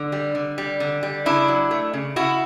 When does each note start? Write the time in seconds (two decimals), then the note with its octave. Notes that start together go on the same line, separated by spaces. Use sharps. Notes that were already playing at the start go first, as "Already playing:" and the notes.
Already playing: D3
0.12 G3
0.35 D3
0.58 G3
0.80 D3
1.03 G3
1.26 C#3 D4 E4
1.48 F#3
1.71 A3
1.93 C#3
2.16 C#3 E4 F#4